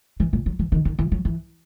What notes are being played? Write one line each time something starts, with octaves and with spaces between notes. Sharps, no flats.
E3
A#2
F#3
E3
D#3
D#3
E3
F#3
E3